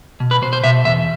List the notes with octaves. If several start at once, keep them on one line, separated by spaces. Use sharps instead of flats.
B2
B4
B2 C5
C5
B2 E5
E2 E5